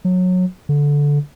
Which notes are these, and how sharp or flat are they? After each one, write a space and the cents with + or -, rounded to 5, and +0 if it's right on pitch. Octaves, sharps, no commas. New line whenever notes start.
F#3 -20
D3 -15